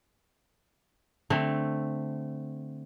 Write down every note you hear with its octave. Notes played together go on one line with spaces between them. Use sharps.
D3 A3 C4